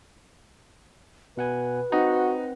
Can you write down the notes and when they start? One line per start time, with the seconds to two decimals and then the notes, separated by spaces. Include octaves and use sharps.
1.37 B2 B4 F#5 G#5
1.92 C4 D#4 F#4 F#5